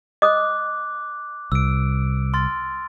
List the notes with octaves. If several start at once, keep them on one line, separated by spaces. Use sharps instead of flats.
D#5 D6 D#6 F#6
C2 E6 D7
C6 F6 A6